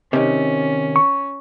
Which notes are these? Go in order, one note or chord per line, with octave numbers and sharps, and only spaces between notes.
C3 D#3 C#4
C#6